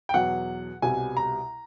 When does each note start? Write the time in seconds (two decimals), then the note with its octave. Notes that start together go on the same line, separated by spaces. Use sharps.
0.09 G5
0.14 E2 B2 F#3 F#5
0.82 C2 B2 G3 G#5
1.17 A#5